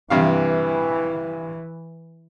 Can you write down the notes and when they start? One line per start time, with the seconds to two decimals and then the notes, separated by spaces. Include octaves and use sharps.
0.10 G2 C3 E3 F5